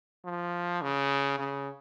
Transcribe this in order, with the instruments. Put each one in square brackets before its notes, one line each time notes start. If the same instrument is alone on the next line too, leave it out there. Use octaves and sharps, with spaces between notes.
[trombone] F3
C#3
C#3